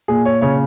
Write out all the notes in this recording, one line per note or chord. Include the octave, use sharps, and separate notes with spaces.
A#2 G#4
C#5
C#3 C#5